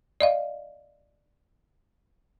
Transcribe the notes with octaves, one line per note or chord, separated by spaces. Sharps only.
D5 D#5 F5